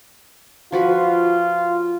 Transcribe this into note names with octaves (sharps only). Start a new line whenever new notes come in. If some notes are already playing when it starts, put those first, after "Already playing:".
F3 F4 F#4 B4